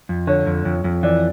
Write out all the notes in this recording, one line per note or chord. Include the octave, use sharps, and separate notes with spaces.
F2
D3 C#5
F2
F2
F2
E3 D5